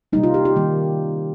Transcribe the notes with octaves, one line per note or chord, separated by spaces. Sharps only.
C3 G3 A#3 D#4
F4
G4
G4
D#3 G3 A#3